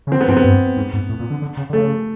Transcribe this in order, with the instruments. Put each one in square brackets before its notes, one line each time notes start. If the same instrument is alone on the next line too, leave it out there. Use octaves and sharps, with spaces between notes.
[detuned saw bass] C#3
[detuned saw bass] D3 [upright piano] C4
[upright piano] B3
[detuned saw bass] G#2 [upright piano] C4
[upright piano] B3
[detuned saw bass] G2
G#2
G#2
A2
A#2
D3
D3
C#3
D3
[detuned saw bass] C#3 [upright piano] A3